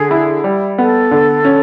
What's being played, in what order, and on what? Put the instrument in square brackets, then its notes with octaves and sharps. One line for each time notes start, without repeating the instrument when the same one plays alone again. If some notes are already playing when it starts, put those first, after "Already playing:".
Already playing: [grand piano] D3 [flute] G#4
[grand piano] E4
G3
[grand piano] B3 [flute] A4
[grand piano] D3
C#4